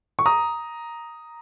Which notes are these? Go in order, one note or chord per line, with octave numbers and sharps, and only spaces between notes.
C#6
A#5 D#6